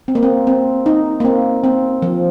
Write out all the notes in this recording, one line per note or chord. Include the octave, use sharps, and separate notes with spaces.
C4
A#3
C4
C4
D#4
A#3
C4
C4
F3